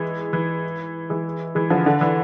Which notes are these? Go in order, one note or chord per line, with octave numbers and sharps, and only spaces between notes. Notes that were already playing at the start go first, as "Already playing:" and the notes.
Already playing: E3 G#3
E3
E3 G#3
E3 G#3
D3 F3
D3
E3